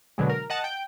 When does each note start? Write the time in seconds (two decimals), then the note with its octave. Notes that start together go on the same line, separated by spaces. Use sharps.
0.18 B2 D3 F#3 G#3
0.29 A#4
0.50 D#5 F#5 A5
0.64 G5